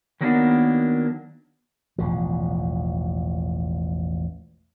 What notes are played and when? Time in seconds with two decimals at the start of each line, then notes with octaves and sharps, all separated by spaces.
0.21 D#3 F#3 A#3 B3 D4 D#4
1.98 E1 A1 F3